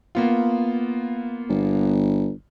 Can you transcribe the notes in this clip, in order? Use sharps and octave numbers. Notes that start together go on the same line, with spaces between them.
A#3 B3 F4
G1